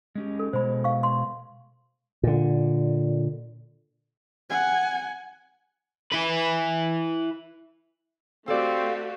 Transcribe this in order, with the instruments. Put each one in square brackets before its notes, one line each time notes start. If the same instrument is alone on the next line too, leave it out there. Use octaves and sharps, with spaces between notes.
[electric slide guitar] G#3 C#4 G4
[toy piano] A4
[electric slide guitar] B2 G#3 [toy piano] C5 B5
[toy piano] F5 C#6
C6
[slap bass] A#2 D3
[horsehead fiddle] F#5 G#5
[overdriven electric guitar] E4 B4
[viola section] A3 F#4 G4 [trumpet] C4 [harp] A4 D5 [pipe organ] F5